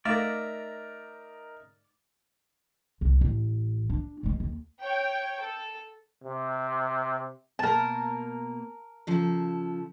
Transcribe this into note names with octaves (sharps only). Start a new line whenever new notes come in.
A3 D#4 A#4 D5 E5 A#5
C2 E3
A1
D4
G2 G#3
D#2
C#5 G5
A4
C3
B2 A#3 A#4 A5
C#3 F3 A4